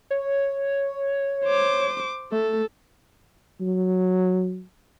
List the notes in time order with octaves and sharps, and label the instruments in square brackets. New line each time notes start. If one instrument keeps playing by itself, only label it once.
[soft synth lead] C#5
[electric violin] C5 D6
[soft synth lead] A3 [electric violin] A4
[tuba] F#3